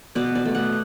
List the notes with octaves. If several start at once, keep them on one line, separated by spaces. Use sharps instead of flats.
B2 D5
D5
A3
F#5